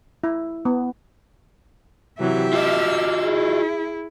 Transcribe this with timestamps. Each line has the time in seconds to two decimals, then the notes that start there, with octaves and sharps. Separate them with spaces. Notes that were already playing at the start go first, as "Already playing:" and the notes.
0.24 E4
0.65 B3
2.19 C3 E3 F#3 G4 E5
2.53 F4 F#4 D#5 D6 E6 F6
3.23 E4 G#4